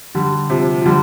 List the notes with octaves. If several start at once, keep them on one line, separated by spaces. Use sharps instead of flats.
D3 G3
C3 F3
F3
D3 G3